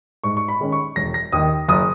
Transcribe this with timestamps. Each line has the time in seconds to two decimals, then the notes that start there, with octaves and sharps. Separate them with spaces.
0.24 G#2 C#6
0.37 C#6
0.48 B5
0.60 D#3 G#3 C#4
0.72 C#6
0.96 E1 A#6
1.14 A#6
1.32 D#2 D#3 D#6
1.69 F#1 D#6